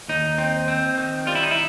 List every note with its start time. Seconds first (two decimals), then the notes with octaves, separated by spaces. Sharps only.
0.08 D#2 D#4
0.38 C4
0.68 C4
0.98 D#3
1.27 G3 F4
1.35 E4
1.43 D#4
1.51 E4